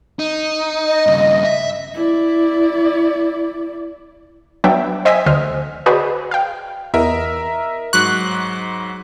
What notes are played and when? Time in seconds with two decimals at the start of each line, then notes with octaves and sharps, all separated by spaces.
0.19 D#4
0.85 D#5
1.07 G2 C#3
1.44 E5
1.94 E4 D5
4.64 F#3 B3 D4 E5 G5
5.05 C5 D#5 E5 G5 G#5 B6
5.26 D2 D3 C5 D#5 F6
5.86 F#4 G#4 B4 C5 D5 D#5
6.31 F5 G5
6.94 E2 A#4 D#5 E5
7.93 G#2 F#3 C#6 F#6